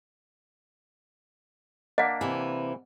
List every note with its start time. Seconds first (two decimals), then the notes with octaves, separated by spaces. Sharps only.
1.98 A#3 D4 D#5 F#5
2.21 C3 E3